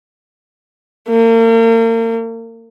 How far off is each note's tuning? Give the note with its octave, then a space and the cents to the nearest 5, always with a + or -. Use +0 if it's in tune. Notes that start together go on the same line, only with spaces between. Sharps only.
A#3 -40